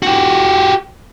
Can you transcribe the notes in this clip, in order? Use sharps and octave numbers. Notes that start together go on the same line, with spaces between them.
F#4 G4